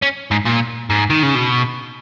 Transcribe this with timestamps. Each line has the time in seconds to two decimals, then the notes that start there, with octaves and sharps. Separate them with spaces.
0.02 C#4
0.31 G#2
0.46 A#2
0.90 G#2
1.10 D#3
1.23 C#3
1.35 B2